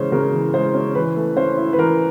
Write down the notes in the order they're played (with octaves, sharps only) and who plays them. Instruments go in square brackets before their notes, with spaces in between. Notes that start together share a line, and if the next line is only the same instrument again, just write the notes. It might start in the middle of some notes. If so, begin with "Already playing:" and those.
Already playing: [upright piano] C#3 E3 G#3 C#4 C5
C#3 A#4
E3
G#3 C5
C#4
E3 B4
A3
C#4 C5
E4
B4
E3 A#4